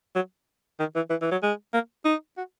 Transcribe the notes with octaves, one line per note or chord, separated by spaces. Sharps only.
F#3
D#3
E3
E3
E3
F#3
G#3
A#3
D#4
F#4